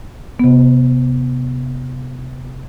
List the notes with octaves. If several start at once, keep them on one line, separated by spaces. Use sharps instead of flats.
C3 B3